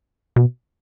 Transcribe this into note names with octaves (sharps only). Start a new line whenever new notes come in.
B2